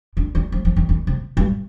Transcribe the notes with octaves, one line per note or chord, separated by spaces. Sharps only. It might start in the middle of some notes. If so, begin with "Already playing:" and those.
D3
D#3
F3
F3
D#3
D#3
C3
G2